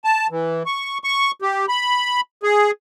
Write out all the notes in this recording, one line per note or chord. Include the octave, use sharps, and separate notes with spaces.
A5
E3
C#6
C#6
G4
B5
G#4